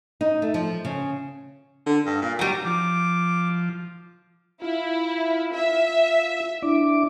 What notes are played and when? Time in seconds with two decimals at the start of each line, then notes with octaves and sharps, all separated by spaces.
0.21 D#4
0.42 A3
0.54 F3
0.85 C#3
1.86 D3
2.06 G2
2.22 A#2
2.39 G#2 F#3 G3
2.65 F3 D6
4.62 E4 F4
5.54 E5
6.62 D4 E4 D6